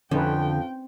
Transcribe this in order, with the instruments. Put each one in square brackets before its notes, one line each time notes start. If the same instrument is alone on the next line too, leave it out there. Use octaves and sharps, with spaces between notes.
[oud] F2 [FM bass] D3 [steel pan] C#4 D#4 B4 [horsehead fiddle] G5